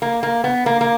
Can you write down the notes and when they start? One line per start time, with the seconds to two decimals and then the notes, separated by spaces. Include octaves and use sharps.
0.02 A#3
0.23 A#3
0.44 B3
0.66 A#3
0.81 A#3